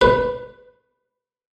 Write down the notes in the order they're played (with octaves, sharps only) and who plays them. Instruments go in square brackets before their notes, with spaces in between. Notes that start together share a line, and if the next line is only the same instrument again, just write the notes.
[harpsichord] B4